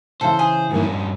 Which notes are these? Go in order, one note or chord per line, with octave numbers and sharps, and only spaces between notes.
C#3 E3 A4 C5 F5
G#4
G2 D#3 E3 A#3 C#4
D5 D#5